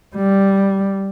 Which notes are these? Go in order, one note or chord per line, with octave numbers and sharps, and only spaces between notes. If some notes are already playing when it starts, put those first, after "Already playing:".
G3